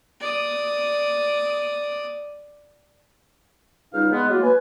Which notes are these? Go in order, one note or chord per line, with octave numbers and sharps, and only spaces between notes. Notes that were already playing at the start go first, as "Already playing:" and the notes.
D5 D#6
C#2 G3 D#4 F5 F6
G#3 B3
F#3 A#3 E4 F4
B4 G#5